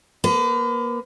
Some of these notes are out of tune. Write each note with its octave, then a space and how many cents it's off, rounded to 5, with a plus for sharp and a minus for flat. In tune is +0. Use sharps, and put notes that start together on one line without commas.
A#3 +30 B4 +40